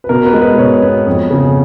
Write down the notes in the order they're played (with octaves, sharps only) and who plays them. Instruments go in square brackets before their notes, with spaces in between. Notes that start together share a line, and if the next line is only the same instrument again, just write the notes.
[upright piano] B4
B2 A#4
B4
G#3
B4
B2 C#5
B3
F2
C#3